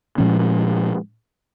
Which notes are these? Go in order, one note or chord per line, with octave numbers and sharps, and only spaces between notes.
A#2 F3 G#3 C#4